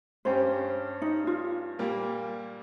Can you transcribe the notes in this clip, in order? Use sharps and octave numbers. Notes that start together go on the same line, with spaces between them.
G2 G3 C#4 G4 C5
D#4
F4
A#2 G3 A#3